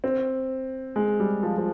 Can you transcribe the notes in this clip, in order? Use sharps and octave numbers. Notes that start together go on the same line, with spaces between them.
C4
G#3
G3
F3
F3